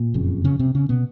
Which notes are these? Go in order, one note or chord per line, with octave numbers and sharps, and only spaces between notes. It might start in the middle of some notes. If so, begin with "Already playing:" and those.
Already playing: A#2
F#1 F2 C#3
C#3 C#4
C3 C4
C#3 C#4
B2 B3